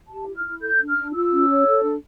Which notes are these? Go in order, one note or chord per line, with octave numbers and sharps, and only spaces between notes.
G4 A5
E4
F6
E4
A4 G6
D4
F6
D4
F4 E6
C#4
C#5
A4
D4